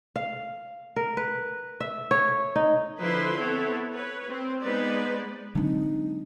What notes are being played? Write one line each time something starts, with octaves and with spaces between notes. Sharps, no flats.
F5
A#4
B4
E5
C#5
D#4
D3 F3 E4 B4 C5 C6
B3 C4 E4 A4 C#5
B4 C#5
C4
G#3 B3 D#4 B4 C5 D5
D3 F#3 G#3 C4 D4 D#4